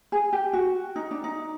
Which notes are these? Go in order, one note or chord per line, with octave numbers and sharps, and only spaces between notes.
G#4
G4
F#4
D#4
D4
D#4